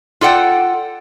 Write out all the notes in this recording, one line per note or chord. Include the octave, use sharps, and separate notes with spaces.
F4 A4 D5 F#5 G5